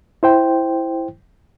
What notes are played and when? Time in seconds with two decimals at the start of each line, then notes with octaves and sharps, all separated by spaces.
0.23 E4 C5 G5